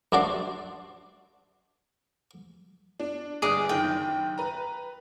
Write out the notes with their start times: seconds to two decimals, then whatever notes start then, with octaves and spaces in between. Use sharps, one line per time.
0.12 F#2 D4 F#4 D5 C6
3.00 D4
3.42 G1 D4 G#4 D#5 D6 F#6
3.69 F#1 D#3 G5
4.38 B4 A#5